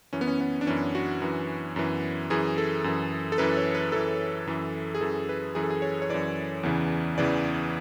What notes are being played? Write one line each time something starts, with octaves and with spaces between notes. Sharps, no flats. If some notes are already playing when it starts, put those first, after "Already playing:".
F#2 E3 C#4
B3
C#4
B3
D4
F#2 E3 C#4
F#4
F#2 E3
F#2 E3
F#2 E3 G#4
A4
F#2 E3
A4
F#2 E3 B4
C#5
B4
F#2 E3 A4
F#2 E3
G#4
F#2 E3 A4
B4
F#2 E3 G#4
A4
G#4
C#5
C#5
F#2 E3 D5
E2 C#3 E3
E2 C#3 E3 D5